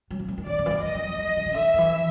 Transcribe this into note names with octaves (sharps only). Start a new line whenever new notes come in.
F#3
F3
E3
D#3
D3 D5
C#3
E3
D#3
F3 D#5
F3
F3
F#3
F3
D#3
C#3
D3 E5
D#3
E3